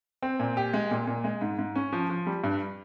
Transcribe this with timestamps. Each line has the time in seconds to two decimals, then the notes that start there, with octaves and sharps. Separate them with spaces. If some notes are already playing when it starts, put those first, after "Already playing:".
0.23 C4
0.40 A#2
0.57 G4
0.74 G#3
0.91 A#2
1.07 A#2
1.24 G#3
1.41 G#2
1.59 G#2
1.76 C#4
1.92 F3
2.10 F3
2.27 G3
2.44 G2